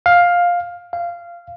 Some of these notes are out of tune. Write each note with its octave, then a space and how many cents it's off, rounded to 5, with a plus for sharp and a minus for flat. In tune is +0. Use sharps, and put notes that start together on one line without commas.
F5 +10
F5 -15